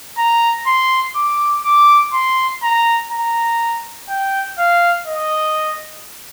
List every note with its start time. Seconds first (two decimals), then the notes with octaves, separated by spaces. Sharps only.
0.18 A#5
0.67 C6
1.16 D6
1.65 D6
2.14 C6
2.63 A#5
3.11 A#5
4.09 G5
4.59 F5
5.07 D#5